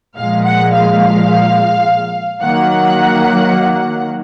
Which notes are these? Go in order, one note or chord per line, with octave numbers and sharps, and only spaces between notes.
A#2 F3 G#3 F5
F#5
F5
D#3 F#3 A#3 F#5